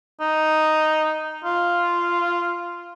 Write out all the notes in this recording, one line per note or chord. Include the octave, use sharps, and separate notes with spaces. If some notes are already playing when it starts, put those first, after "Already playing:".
D#4
F4